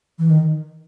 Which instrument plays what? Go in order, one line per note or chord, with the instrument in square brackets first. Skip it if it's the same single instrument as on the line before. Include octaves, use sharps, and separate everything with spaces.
[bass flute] E3
D#3